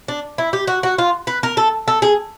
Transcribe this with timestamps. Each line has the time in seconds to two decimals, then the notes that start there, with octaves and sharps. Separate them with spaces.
0.08 D4
0.38 E4
0.53 G4
0.67 F#4
0.83 F#4
0.98 F4
1.27 B4
1.43 A#4
1.57 A4
1.88 A4
2.02 G#4